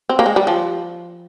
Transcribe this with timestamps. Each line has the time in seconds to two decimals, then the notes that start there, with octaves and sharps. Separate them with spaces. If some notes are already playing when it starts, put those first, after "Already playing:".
0.09 C4
0.19 A#3
0.26 G#3
0.36 G3
0.47 F3